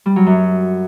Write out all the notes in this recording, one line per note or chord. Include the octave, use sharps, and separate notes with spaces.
G3
F#3
F#2